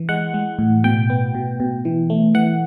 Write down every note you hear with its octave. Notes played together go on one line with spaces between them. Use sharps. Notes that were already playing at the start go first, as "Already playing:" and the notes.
Already playing: E3
G#3 F#5
G#3
A2
B2 G5
B3
B2
B2
E3
A3
E3 F#5